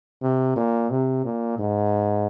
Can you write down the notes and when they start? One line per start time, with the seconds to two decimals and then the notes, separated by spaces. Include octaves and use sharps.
0.22 C3
0.56 A#2
0.90 C3
1.25 A#2
1.59 G#2